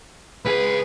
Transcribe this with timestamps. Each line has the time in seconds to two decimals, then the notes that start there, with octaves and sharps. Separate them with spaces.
0.45 C#2 G#4 B4